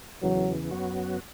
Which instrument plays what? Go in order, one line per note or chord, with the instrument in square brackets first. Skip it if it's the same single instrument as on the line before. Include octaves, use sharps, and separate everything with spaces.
[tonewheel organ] E2 C#3 E3 [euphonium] F#3
[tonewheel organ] F#2 F#3 B3 F#4